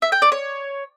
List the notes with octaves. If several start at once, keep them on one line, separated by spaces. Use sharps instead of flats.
E5
G5
D5
C#5